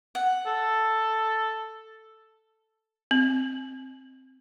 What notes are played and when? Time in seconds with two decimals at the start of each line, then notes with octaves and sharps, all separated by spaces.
0.15 F#5
0.46 A4
3.11 C4